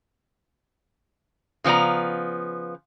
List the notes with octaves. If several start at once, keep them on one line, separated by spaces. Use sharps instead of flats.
C#3 F3 B3 D5 A#5